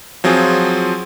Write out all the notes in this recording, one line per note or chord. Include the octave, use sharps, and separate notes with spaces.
F3 F#3 C4 F4 G#4